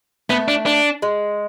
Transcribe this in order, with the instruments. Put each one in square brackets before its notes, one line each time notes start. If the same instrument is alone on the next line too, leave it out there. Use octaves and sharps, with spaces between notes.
[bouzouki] A3 [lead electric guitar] B3
[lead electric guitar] D4
D4
[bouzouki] G#3